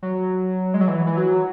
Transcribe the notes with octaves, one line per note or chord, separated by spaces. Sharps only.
F#3
G#3
F#3
E3
E3
F#3